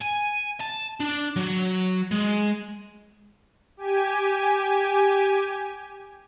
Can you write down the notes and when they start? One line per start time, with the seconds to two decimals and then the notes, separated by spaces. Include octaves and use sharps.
0.02 G#5
0.61 A5
1.00 D4
1.36 F#3
2.12 G#3
3.77 G4 G#5